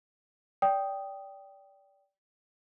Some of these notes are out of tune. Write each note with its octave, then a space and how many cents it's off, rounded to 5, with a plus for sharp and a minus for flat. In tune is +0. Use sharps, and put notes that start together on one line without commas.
D5 -25 G5 +0 D#6 +0